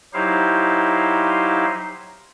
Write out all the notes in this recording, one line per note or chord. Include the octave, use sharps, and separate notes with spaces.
F#3 D#4 E4 G4 C5 F5